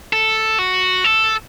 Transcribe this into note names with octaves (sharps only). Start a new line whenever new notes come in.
A4
F#4
A4